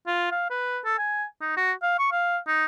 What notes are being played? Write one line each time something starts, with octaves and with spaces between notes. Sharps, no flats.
F4
F5
B4
A4
G#5
D#4
F#4
F5
C#6
F5
D#4